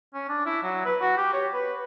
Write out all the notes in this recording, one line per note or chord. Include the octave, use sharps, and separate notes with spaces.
C#4
D4
E4
F#3
B4
F#4
G4
C#5
B4